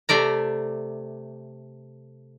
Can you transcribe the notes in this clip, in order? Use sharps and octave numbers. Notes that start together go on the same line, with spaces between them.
C3 A3 D5 A#5